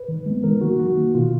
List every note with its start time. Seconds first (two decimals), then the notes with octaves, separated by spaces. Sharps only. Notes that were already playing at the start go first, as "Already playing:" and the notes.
Already playing: B4
0.08 D#3
0.26 G#3 B3
0.44 D#3 A#4
0.61 F#3 A#3 F#4
0.79 D#3 F#4
0.97 A#3
1.15 B2 F4